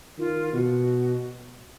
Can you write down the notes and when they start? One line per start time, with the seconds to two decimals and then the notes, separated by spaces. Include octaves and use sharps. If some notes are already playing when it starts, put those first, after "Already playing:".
0.18 D#3 F4
0.53 B2 F#4